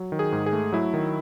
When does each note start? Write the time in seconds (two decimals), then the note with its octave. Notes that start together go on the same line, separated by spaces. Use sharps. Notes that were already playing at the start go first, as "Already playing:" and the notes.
Already playing: F#3
0.12 D#3
0.19 G#4
0.32 G#2
0.46 G#4
0.53 A3
0.72 F#3 E4
0.94 D#3